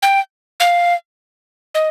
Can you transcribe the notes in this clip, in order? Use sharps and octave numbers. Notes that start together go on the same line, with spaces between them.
G5
F5
D#5